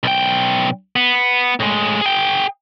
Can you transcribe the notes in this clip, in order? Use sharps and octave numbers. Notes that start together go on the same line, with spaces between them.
B1 G5
B3
A2 G#3
G#4 G5